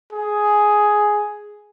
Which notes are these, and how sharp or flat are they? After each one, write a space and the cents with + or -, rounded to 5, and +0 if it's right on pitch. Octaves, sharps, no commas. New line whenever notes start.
G#4 +5